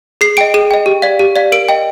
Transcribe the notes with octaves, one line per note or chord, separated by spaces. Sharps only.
G#4 C7
D#5 G5 D7
G#4 D#7
D#5 G5
G4
D5 F5
G4
D5 F5
A#4 D7
D#5 G5